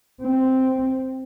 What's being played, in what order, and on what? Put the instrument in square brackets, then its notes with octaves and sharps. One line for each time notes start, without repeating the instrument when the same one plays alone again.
[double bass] C4